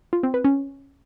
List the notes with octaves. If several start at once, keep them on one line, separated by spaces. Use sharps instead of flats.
F4
C4
B4
C#4